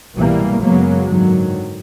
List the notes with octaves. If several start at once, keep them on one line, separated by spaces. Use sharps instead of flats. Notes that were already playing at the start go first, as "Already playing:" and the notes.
C2 G#2 B2 E3 G3 A#3
F#2 C#3 F#3 G#3 A#3 B3
G#2 D3 D#3 F#3